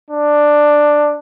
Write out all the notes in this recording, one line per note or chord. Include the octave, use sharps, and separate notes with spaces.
D4